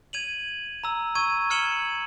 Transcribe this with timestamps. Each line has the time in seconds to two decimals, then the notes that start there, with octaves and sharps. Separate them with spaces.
0.13 G#6 D#7 F7 F#7
0.84 A#5 E6
1.15 C#6 E6 G#6 D#7
1.50 F6 G#6 C#7 E7 F#7 G7